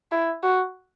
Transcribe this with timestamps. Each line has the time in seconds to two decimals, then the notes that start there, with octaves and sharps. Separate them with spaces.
0.12 E4
0.43 F#4